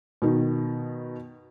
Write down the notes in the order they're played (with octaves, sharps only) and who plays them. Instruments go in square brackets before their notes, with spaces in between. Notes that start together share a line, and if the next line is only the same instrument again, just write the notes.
[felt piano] B2 D#3